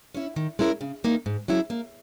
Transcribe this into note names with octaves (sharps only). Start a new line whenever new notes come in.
C#4 E4
D#3
G#3 C#4 E4 A#4
C#3
E3 A#3 D#4
G#2
F#3 C#4 E4 G#4
A#3